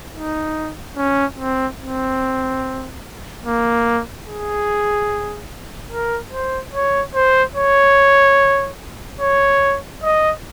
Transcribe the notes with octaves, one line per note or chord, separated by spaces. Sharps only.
D#4
C#4
C4
C4
A#3
G#4
A#4
C5
C#5
C5
C#5
C#5
D#5